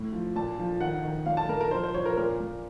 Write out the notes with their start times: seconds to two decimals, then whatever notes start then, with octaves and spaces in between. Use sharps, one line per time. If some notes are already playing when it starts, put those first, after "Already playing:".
Already playing: A2
0.12 F3
0.36 A#2 A5
0.59 F3
0.80 D#3 F#5
1.04 D#3
1.26 A#2 F5
1.37 A5
1.49 A#2 A#4
1.61 A#4
1.71 F3 C5
1.83 C5
1.94 F3 C#5
2.06 A#4
2.17 A#2 A#4
2.40 A#2